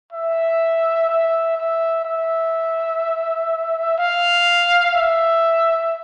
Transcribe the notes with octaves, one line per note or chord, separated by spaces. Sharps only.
E5
E5
E5
E5
F5
E5